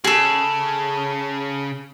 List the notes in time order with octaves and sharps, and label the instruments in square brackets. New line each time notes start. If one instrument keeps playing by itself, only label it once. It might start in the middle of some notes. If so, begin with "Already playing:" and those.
[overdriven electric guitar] C#3 [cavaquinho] G#4 A4